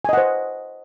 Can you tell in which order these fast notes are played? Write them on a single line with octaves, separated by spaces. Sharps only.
G#5 D#5 F#5 C5